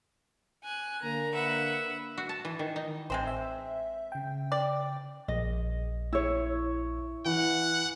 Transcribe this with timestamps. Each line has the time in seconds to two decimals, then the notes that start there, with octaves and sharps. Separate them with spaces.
0.64 G#5 F#6
1.03 D3 A#3 A#5
1.33 B4 E5 F#5
2.18 F#4
2.29 A5
2.45 E3
2.59 D#3
2.76 D#4
3.10 A1 G#3 C4 C5
3.27 E5
4.12 C#3 G5
4.52 D5
5.28 A#1 D#5
6.13 E4 C#5
7.26 E3 F#5